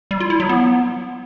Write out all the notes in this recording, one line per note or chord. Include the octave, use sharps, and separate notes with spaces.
G3
F4
E4
F#3
B3